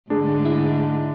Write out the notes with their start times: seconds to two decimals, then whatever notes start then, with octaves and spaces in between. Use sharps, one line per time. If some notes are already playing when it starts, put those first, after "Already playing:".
0.10 G#2 D3 G#3 A3 D4 G#4
0.45 E4